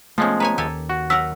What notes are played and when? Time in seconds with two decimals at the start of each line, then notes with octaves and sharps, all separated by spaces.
0.18 C3 F3 G#3 A3 B3 C#4
0.40 B4 C#5 G#5 A#5
0.58 D#2 D#3 G4 A4 G#5
0.89 F#4
1.10 F#3 A#4 F#5 E6 B6